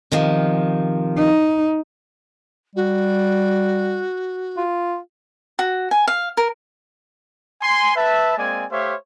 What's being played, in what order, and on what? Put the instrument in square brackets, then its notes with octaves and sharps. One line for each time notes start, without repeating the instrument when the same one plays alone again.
[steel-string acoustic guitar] C3 D#3 F3
[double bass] D#4
[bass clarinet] G3 [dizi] F#4
[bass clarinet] F4
[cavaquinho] F#4
G#5
F5
A#4
[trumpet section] G#5 C6
B4 E5 A5
G#3 A#3 C4 D5 G#5
A3 G4 C5 C#5 E5 F5